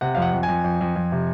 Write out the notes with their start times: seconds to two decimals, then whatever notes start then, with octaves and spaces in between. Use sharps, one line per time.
0.01 C3 F#5
0.15 F2 F5
0.22 F#5
0.33 F2
0.43 G#5
0.48 F2
0.64 F2
0.81 F2
0.96 F2
1.12 C3